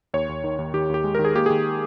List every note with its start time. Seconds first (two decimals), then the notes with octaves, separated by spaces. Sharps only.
0.14 D#2 C#5
0.29 D#2
0.44 D#3
0.59 D#2
0.74 D#3 G4
0.90 D#2 G4
1.04 G#3
1.15 D#3 A#4
1.25 G#4
1.35 A#3 G4
1.46 D#3 G#4